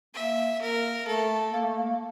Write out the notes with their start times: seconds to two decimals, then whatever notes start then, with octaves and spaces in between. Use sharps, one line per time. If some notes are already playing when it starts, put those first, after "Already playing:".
0.14 A#3 E5
0.60 A#3 A#4
1.06 A3 A4
1.52 A#3
1.63 A3
1.74 A#3